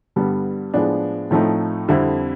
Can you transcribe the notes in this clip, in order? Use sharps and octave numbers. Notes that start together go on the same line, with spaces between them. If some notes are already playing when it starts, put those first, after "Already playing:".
G2 D3 G3 B3
A2 F3 G#3 B3 D4
A2 F3 A3 C4 D#4
F2 D3 G3 C4 E4